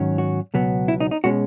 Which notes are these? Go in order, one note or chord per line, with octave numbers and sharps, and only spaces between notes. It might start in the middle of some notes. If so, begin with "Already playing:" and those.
Already playing: G#2 D#3 F#3 C#4
F#4
C#2 B2 F#3 B3
E4
D#4
D#4
B2 G#3 C#4 F#4